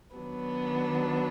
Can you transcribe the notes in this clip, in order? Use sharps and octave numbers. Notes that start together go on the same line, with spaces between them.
D#3 F#3 B3 D4